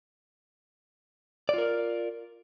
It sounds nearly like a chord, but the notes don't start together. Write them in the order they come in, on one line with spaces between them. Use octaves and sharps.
D5 F4 A#4